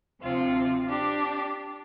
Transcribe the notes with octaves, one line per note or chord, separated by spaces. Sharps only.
D2 C3 F3 C4 F4
D4 G4